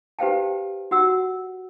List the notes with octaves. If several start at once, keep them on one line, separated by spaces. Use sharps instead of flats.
G4 B4 C5 F5 G5 A5
F#4 F#5 E6